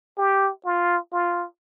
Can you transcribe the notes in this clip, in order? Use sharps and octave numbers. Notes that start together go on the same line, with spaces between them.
G4
F4
F4